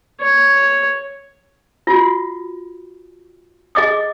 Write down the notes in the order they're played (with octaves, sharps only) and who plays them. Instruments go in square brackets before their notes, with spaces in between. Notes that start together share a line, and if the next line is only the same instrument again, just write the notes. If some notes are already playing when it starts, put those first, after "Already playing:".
[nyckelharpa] C#5
[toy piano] F4 F#4
G#4 D#5 D6 D#6